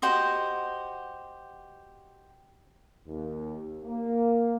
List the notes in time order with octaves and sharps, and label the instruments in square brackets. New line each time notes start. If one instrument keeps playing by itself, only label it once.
[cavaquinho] F#4 G4 C5 D#5
[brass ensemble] D#2
A#3